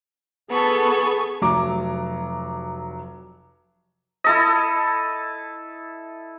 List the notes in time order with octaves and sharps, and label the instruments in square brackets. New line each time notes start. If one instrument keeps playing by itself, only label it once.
[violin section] B3 A4 [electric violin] G#4 C#6
[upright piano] F1 F#3 A#5 D6
[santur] E4 A4 D#5